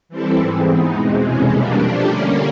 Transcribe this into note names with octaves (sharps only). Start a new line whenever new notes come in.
E3 G3 C4 E4 A4
G#2 E3 G#3 C4
E3 G#3 B3 D#4
E2 B2 G#3 C4
F2 C3 E3 G#3 C#4
B2 G3 A#3 D4
F3 A3 D4 G4
D3 G3 A#3 C#4